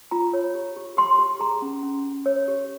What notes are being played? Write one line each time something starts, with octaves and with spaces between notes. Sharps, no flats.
F4 A#5
C#5
G4
G4
G4 C6
G4
G#4 A#5
C#4
C#4
C#4
C#5
G4